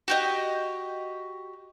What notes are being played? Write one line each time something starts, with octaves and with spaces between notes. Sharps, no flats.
F#4 G4 D#5